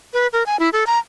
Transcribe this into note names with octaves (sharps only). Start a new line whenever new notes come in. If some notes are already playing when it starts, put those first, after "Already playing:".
B4
A#4
G#5
E4
A4
A#5